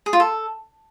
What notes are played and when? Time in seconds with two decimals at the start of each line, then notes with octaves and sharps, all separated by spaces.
0.06 G#4
0.13 F4
0.20 A4